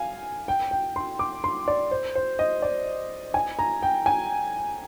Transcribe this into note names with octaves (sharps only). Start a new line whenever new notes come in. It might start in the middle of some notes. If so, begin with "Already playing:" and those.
Already playing: F5 G#5
G5
G5
C6
D6
C6
D5
C5
C5
D#5
D5
G#5
A#5
G5
G#5